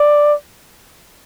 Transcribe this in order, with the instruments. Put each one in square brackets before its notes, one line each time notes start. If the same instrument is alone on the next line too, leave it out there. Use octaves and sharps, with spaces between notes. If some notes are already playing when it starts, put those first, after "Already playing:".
Already playing: [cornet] D5